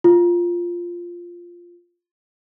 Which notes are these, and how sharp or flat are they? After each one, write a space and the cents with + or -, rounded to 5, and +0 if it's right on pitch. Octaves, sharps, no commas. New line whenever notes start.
F4 -5